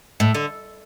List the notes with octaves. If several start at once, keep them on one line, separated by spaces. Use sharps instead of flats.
A2
D3